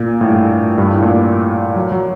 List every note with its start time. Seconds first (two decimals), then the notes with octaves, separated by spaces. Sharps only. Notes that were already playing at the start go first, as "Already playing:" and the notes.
Already playing: A#2
0.21 A2
0.29 G2
0.78 G2
0.91 A2
1.02 A#2
1.76 F#3
1.92 F#3